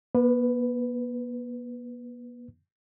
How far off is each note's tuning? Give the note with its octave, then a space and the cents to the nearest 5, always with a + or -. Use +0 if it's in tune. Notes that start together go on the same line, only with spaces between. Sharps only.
B3 -45 B4 +10